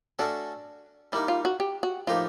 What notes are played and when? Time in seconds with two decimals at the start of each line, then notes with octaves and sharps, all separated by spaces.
0.19 A3 C#4 D4 F#4 A4
1.12 G3 A#3 D#4 E4
1.28 F4
1.45 F#4
1.60 G4
1.83 F#4
2.07 A2 F3 A#3 D#4 F4 G4